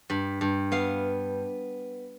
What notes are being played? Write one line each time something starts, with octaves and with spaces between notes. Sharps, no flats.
G2 B5
G2
B3 F5